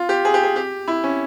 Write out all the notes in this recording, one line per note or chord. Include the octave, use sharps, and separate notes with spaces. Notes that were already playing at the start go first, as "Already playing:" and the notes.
Already playing: F4
G4
G#4
G4
G#4
G4
E4
C#4